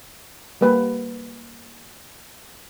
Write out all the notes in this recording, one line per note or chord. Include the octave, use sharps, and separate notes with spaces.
G3 A#3 B4